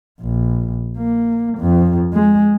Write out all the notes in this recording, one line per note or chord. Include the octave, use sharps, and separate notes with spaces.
A#1
A#3
F2
G#3